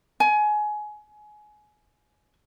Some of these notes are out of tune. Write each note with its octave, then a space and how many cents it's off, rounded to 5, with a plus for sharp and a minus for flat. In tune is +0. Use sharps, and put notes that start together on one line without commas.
G#5 +20